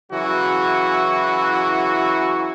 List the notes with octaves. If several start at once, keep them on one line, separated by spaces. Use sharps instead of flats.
C#3 E3 F#3 E4 F#4